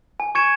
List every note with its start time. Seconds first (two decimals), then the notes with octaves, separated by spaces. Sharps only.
0.20 G#5
0.35 C#6 G#6 C#7 E7